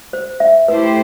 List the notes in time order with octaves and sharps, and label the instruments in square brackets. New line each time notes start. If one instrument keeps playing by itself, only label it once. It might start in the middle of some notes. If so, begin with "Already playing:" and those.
[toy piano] C5
E5
[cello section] A3 E4 G4 C5 [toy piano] B4